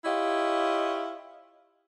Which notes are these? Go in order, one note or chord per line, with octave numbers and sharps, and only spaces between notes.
E4 F4 G4 C#5 D#5